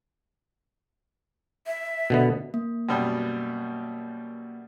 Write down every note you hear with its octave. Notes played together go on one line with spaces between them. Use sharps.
E5
B2 D3 B3
A#3
F#2 B2 G3